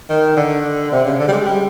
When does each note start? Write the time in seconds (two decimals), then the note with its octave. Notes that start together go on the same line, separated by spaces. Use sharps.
0.09 D#3
0.37 D3
0.92 C3
1.05 C#3
1.19 D3
1.28 G3
1.32 G#3
1.46 G3